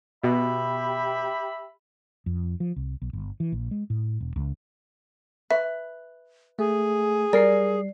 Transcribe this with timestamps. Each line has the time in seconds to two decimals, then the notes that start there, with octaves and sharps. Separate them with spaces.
0.24 B2 G4 E5 B5
2.26 F2
2.60 F3
2.76 C2
3.02 B1
3.13 G1
3.40 E3
3.52 A#1
3.71 G#3
3.90 A2
4.21 E1
4.36 C#2
5.51 B4 E5
6.59 A3 G#4
7.33 G3 A#4 D5 C7